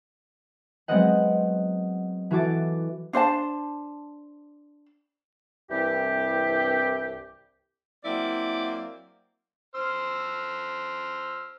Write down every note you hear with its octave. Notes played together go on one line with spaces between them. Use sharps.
F#3 G#3 B3 C4 D#5 F#5
E3 F#4 A4 D6 A6
D4 C5 D#5 A5
C2 G2 E3 C4 G4
F#3 A#3 C4 E4 D5
C5 E6 F6